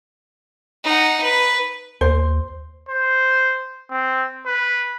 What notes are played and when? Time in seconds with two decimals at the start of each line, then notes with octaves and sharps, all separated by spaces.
0.84 D#4 F#5
1.22 B4
2.01 D#2 C5
2.89 C5
3.90 C4
4.46 B4